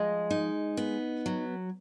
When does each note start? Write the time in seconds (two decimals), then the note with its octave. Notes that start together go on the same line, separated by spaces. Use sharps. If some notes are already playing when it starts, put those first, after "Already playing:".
Already playing: F3 G#3 D#5
0.31 D#4
0.77 B3
1.26 F#3